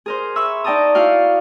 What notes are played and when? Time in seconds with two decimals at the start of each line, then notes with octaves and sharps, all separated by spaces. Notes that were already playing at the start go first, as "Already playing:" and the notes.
0.06 G#4 A#4 C5
0.36 E5 B5 C#6 E6
0.64 D#4 D5 G5 A5 A#5 D#6
0.95 E4 F#4 F5 G5